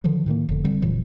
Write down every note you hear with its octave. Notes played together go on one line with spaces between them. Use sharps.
D3 D#3 F3 F#3
A2 D#3 G#3 A#3
F1 D3
D3 G3 C4
F1 A#2 E3 F#3